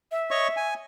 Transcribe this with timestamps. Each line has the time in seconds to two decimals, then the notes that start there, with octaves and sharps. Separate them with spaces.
0.12 E5
0.31 C#5 D#5 C#6
0.57 G#5